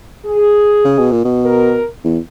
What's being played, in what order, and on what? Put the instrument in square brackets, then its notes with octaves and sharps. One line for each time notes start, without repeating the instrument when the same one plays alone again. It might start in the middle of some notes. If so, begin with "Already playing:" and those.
[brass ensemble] G#4
[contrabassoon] C#3
B2
A#2
B2
[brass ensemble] A#4
[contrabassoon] E2